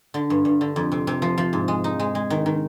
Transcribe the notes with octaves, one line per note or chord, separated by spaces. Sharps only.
D3
G2
G2
D3
F2
C3
C3
F3
F3
G#2
G#3
D#4
G#3
G#3
D#3
D#3